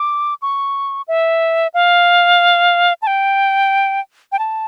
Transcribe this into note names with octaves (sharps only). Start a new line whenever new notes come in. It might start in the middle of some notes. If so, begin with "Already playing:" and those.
Already playing: D6
C#6
E5
F5
A5
G5
G5
A5